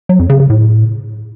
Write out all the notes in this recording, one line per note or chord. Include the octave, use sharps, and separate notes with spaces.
F#3
F2
C#3
C#3
A2